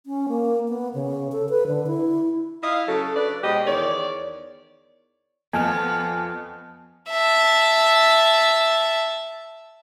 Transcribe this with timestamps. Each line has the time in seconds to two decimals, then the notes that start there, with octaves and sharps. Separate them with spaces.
0.06 C#4
0.29 A#3
0.68 B3
0.94 C#3
1.32 A4
1.50 B4
1.67 D3
1.87 E4
2.63 E4 D#5 F5
2.88 C#3 F#3 F#4 A4
3.16 D4 B4 D5
3.44 B2 G#3 G4 C5 D#5
3.66 E2 D#3 C#5 D5
5.53 F2 F3 B3 G#5 F6
7.10 E5 A5